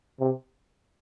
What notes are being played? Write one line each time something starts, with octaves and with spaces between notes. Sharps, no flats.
C3